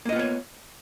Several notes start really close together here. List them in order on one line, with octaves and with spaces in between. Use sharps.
A#3 D#5 F4 B3 C#5